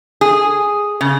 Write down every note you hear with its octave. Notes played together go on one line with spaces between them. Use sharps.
G#4
C#3